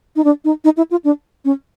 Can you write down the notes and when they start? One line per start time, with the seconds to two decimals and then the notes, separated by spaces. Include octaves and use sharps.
0.16 D#4
0.24 D4
0.45 D#4
0.64 D#4
0.77 E4
0.91 F4
1.05 D4
1.45 C#4